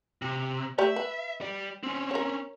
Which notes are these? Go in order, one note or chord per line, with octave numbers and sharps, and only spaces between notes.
C3
A3 G4 D5 E5
B4
G3 D5
C4 C#4
A#4 C#5